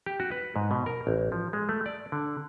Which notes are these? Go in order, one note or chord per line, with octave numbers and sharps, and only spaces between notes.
G4
F#4
B4
G#2
B2
A#4
A1
F3
G#3
A3
D5
D3